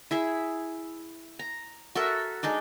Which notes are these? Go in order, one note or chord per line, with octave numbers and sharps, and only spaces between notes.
E4 G#4 E5
A#5
F#4 A4 A#4 E5
G#3 D4 D#4 D5